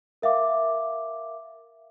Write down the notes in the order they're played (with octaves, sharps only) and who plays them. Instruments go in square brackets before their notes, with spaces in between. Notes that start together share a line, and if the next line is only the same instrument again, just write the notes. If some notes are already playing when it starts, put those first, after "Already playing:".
[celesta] A#4 E5 F5 D6